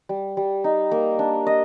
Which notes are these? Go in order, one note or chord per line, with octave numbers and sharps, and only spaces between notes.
G3
G3
D#4
A#3
D4
D#5